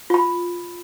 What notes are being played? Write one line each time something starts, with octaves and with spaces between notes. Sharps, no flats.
F4 B5